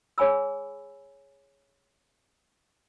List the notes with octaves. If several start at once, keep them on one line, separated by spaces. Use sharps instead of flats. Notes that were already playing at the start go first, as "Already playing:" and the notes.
G#4 C#5 G#5 B5 E6